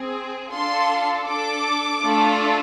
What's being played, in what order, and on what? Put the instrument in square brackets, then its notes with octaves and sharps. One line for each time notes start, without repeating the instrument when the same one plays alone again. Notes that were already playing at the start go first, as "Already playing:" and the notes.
Already playing: [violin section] C4 G#4
D4 F4 A4 C6
D4 A4 D6
A3 D4 F4 A4